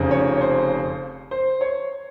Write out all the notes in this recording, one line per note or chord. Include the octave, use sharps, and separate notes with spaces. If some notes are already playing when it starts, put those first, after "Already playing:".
Already playing: F1 F2 C#3
C#5
C#5
C5
C5
C#5